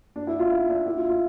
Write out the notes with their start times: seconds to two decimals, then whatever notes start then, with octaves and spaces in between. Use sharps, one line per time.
0.16 D4
0.27 E4
0.39 F4
0.51 E4
0.69 D4
0.86 E4
0.97 F4
1.09 F4